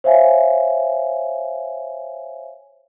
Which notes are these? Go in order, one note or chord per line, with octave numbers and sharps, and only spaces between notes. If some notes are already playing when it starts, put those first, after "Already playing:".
C5 C#5 E5 F5 G#5